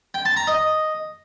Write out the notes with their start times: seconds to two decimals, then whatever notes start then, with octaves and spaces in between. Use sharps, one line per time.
0.14 G5
0.25 A5
0.36 A#5
0.47 D#5